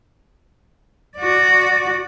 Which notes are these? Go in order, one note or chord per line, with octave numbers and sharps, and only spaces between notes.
F#4 D5